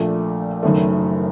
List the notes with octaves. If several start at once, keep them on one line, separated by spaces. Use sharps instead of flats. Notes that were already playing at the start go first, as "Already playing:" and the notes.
Already playing: A#1 A#2 A3
F#1 F#2 D#3 A3